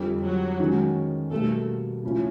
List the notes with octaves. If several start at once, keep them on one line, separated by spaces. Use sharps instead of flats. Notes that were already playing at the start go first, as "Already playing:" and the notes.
Already playing: F2 D3 G3
F#3 F#4
D#3 G#3 C#4
B2 G3 A3 A#3 A4
C#3 F3 A3 C#4 E4